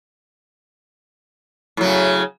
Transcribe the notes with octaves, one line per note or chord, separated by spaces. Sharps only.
A2 C#3 F#3